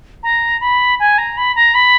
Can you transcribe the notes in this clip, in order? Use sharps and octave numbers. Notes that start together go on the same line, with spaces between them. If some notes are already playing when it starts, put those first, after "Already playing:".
A#5
B5
G#5
A#5
B5
A#5
B5